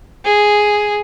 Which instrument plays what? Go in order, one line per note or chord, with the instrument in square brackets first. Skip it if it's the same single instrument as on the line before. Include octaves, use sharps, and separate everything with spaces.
[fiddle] G#4